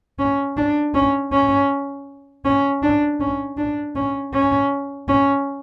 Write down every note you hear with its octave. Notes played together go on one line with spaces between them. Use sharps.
C#4
D4
C#4
C#4
C#4
D4
C#4
D4
C#4
C#4
C#4